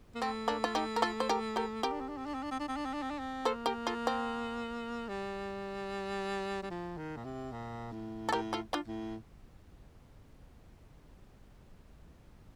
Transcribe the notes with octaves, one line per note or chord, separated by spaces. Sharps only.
A#3
A3 C4
A#3 D4
F4
D#4 G4
A#4
F4 A4
C5
G4 A#4
G4 A#4
C4 G4 A#4
D4
C4
D4
C4
D4
C4
D4
C4
D4
C4
D4
C4
D4
C4
D4
C4
A#3 A4 C5
G4 A#4
F4 A4
C4
G3
G3
F3
D#3
A#2
C3
A#2
A2
A4
A2 G4 A#4
F4 A4
D4 F4
A2